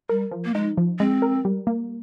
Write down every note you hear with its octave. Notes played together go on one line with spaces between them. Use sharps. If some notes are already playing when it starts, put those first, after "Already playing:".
G3 A#4
F3
A#3
G#3 D#4
F3
G#3 C4
A#4
G3
A#3